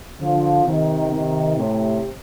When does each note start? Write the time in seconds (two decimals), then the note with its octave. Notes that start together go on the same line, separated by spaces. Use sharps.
0.20 D3 F3
0.65 C3 D#3
1.11 C3 D#3
1.56 A2 C3